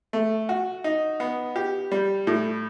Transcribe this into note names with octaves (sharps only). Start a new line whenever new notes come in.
A3
F#4
D#4
B3
G4
G3
A2